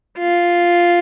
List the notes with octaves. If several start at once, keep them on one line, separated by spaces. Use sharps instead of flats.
F4